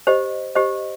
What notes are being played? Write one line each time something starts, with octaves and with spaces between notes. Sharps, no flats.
G4 C5 D#5
G4 C5 D#5